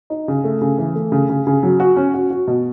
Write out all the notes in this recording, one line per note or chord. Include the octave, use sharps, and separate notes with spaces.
D#4
C#3
A3
C#3
E3
A3
C#3
C#3
C#3
F#3
F#4
C#4
F#4
F#4
B2